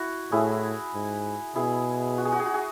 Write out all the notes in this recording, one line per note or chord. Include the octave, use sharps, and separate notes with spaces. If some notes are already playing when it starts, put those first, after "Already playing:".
Already playing: E4 F#4
A2 E4 G#4
G#2
B2 E4 G#4
F#4
G#4
F#4
G#4
F#4
G#4